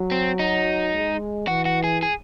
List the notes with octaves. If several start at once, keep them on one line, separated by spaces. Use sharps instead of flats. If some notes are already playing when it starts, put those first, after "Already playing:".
Already playing: F#3
C4
D#4
G#3
E3 F#4
F#4
G#4
G#4